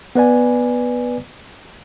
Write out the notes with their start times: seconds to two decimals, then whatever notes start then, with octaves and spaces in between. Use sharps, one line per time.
0.15 B3 B4 D5 G#5